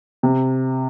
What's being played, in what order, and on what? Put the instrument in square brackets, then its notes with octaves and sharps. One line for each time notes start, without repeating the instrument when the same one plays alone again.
[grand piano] C3